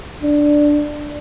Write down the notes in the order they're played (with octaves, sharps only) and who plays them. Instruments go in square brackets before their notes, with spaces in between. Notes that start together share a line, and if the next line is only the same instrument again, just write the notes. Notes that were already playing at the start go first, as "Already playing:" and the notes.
[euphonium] D4